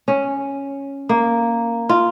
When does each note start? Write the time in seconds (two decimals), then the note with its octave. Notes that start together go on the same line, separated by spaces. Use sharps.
0.08 C#4
1.09 A#3
1.89 F4